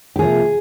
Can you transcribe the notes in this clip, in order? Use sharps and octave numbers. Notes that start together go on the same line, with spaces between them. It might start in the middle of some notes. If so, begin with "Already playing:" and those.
G4
C3 F3 A#3 G#4